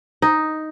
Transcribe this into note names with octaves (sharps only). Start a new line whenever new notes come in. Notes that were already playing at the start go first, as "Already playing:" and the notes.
D#4